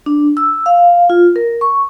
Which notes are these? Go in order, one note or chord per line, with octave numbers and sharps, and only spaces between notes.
D4
E6
F5
F4
A#4
C#6